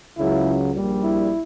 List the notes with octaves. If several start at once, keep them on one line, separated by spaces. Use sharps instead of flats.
C#2 C#3 F#3 E4
A#1 A#2 G3
E4